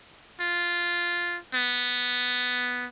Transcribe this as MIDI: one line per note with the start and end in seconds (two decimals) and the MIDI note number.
0.41 1.38 65
1.54 2.86 59